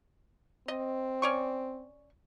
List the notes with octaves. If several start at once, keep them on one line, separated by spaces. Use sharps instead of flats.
C4 D#5
C#4 D5 C#6